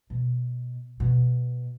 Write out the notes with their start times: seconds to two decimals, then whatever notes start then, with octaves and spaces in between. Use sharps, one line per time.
0.10 B2
1.00 B2